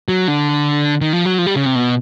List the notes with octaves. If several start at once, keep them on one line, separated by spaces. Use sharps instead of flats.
F#3
D3
D#3
F3
F#3
F3
G3
C#3
C3
B2